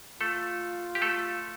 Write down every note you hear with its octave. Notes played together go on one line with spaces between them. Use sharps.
A3 F4 A4
G4
A3 A4